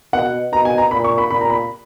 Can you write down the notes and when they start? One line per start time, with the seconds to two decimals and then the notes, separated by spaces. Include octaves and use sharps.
0.13 B2 F#5
0.52 B2 A#5
0.65 G#5
0.78 A#5
0.91 A#2 B5
1.04 C#6
1.18 B5
1.31 A#2 B5
1.41 A#5
1.50 B5